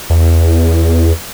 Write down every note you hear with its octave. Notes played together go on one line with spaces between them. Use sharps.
E2